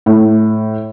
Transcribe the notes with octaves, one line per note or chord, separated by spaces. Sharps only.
A2